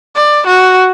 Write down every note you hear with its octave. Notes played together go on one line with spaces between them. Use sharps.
D5
F#4